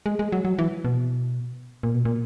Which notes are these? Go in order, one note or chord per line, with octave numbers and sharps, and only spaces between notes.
G#3
G#3
F#3
F#3
E3
B2
A#2
B2
A#2